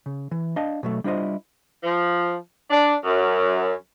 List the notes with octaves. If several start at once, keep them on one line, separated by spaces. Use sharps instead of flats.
C#3
E3
D4 D#5 F5 A5
B2 F#3 A3
G3 D4 E4 F4 C5 D#5
F3
D4
F#2